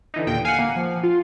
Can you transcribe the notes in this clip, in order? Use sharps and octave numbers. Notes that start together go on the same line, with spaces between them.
D3 E3 D#4
D#2 A#2 D3 G5
F5 F#5 G#5
A#3
F3
F4